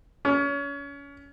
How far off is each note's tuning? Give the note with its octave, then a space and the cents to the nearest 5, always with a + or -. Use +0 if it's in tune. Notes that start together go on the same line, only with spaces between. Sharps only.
C#4 +30